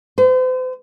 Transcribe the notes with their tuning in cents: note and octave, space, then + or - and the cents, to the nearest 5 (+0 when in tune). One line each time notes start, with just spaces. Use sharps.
C5 -40